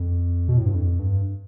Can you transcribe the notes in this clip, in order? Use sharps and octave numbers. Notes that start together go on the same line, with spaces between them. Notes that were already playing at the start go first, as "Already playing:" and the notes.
Already playing: F2
B2
A2
G2
F2
G2